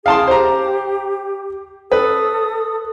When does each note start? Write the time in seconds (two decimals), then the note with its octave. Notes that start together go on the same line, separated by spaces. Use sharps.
0.06 G#4 F5 G5 A5 C6 D#6
0.27 G4 C5 A#5
1.92 A4 B4 D#6